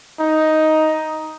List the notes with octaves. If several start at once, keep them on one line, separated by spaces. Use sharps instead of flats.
D#4